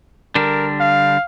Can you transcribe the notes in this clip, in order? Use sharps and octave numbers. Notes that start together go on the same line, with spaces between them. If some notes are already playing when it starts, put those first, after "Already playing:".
D3 G3 D4 A#4
F5